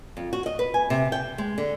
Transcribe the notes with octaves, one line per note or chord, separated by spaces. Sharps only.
F2
F#4
D#5
B4
G#5
C3
G5
G#3
D3